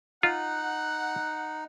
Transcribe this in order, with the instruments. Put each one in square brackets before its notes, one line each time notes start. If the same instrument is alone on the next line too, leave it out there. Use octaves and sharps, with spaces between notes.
[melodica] D#4 [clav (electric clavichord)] F4 [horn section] F#5